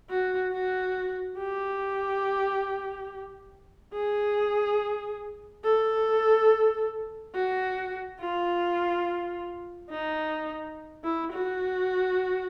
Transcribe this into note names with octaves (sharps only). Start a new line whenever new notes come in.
F#4
F#4
G4
G#4
A4
F#4
F4
D#4
E4
F#4